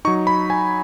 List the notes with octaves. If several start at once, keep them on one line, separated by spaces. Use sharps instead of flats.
F#3 D#4 C#6
B5
G#5